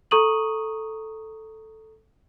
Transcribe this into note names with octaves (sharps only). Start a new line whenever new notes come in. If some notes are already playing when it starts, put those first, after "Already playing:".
A4 A#5 C#6 D#6 D#7 F#7